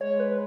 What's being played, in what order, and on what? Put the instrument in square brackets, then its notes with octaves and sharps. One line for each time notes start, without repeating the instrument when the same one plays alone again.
[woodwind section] G#3 [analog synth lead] C#5
[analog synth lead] B4